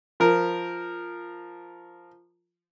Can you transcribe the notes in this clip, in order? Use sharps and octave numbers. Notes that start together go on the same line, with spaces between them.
F3 A#4